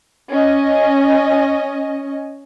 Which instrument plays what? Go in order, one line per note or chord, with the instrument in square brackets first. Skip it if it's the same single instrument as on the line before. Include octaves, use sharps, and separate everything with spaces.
[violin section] C#4 D#5